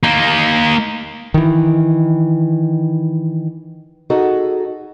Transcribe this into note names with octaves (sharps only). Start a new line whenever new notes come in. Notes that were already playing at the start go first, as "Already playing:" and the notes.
A#3 D#4
D#3 E3
D#4 F#4 G#4 A4 D#5